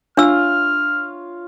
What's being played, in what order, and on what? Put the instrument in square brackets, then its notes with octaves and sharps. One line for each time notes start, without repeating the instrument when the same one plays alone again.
[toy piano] D4 E6 [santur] F4 C#5 F5 [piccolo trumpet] F6